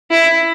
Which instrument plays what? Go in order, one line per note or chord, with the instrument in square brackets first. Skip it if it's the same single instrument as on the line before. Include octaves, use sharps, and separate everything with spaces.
[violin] E4